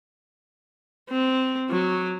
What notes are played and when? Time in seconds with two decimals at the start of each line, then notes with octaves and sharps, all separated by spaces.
1.09 C4
1.70 F#3